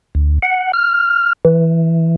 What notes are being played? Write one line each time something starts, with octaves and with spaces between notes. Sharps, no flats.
D2
F#5
F6
E3